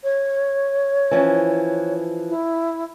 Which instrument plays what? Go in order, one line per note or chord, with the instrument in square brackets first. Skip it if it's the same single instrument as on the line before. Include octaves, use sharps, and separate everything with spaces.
[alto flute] C#5
[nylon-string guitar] E3 F3 C#4
[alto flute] E4